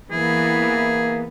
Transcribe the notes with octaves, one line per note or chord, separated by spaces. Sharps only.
E3 A#3 B3 G#4